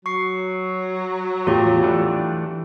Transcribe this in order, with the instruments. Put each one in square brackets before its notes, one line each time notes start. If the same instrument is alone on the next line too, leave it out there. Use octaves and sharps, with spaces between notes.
[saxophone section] F#3 [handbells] C#6 C7
[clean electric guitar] E2 A2 [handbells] F4 G4 G5
[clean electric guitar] E3 A3 D4